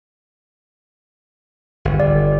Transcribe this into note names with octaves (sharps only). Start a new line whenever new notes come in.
G1
D5